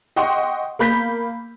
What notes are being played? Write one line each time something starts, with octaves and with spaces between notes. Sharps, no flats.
D#5 F#5 G5 C6 C#6
A#3 B5 G6 B6